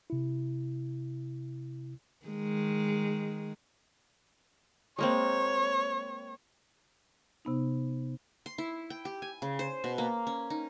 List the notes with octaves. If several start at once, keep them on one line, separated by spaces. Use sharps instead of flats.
C3 E4
D#3 G#3
G#3 A#3 C4 C#5
C3 B3 D#4
C6
E4
G5
G4
G#5
C#3
C5
B2
A#3
C#4
D#4